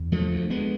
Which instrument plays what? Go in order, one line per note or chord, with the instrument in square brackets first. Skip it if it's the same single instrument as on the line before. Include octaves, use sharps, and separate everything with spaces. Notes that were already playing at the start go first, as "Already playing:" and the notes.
Already playing: [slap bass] E2
D2 F3 A3
D2
D2 G#3 B3